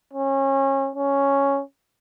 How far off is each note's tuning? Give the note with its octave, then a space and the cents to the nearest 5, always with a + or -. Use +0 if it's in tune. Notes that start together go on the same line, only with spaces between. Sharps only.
C#4 -30
C#4 +0